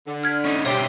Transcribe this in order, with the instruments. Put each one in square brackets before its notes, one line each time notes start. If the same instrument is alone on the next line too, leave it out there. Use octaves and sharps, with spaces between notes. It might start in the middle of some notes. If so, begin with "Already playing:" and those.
[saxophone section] D3
[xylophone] F6 G#6 B6
[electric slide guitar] C#4 D#4
[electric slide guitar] B2 C5 E5 [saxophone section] G3 G4 [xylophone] C#5